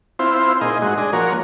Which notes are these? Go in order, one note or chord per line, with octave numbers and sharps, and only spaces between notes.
C4 E4 F4 C5
A#2 D#4 G#4 D#5
G#2 G#3 F#4
D4 G#4 D#5
F3 A#3 F#4 A#4 C#5